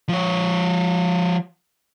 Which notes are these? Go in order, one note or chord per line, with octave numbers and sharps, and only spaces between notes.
F3 C#5